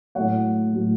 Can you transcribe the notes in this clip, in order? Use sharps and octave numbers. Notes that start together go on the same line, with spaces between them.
A2 F#3 C#5 F#5
A2 F#3